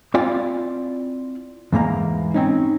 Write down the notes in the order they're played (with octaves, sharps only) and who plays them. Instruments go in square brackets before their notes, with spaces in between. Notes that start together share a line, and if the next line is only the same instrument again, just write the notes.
[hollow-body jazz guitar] C4 E4 F4 D5 F5 G#5
E2 G#2 A#3 A#5
C4 C#4 D#4